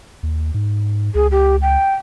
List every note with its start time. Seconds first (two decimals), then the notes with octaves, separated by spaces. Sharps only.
0.23 D#2
0.54 G#2
1.15 C#2 G#4
1.31 G4
1.62 G5